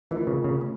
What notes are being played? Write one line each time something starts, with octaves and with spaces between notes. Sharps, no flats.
E3 A3 C#4 F4 A#4 D#5
C#3
C#3
A3